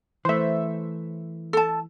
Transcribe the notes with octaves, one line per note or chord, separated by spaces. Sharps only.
E3 A3 C5 E5
A4 A5